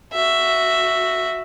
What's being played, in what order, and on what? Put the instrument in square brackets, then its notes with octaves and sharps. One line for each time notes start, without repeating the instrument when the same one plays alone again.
[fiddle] F#4 E5